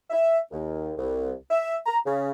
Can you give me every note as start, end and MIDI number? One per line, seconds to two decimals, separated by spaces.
0.10 0.38 76
0.51 0.91 39
0.98 1.31 36
1.49 1.76 76
1.85 1.96 82
2.04 2.31 49